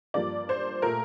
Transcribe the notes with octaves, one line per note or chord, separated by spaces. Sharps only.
G2 F3 A#3 D5
C5
A#2 A3 A#4